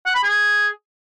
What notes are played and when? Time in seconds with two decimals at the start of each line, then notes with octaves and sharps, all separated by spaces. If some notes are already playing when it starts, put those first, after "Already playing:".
0.06 F#5
0.15 B5
0.24 G#4